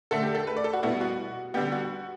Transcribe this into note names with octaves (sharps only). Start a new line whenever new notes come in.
D3 A3 A4
G4
A4
B4
D5
A4
F#4
B2 G3 B3 E4
F#4
D3 G3 B3 G4
F#4